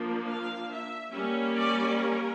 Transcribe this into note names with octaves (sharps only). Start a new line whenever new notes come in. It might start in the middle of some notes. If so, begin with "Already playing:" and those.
Already playing: F3 A#3 D4
F5
E5
G3 A#3 C#4
D5
A#4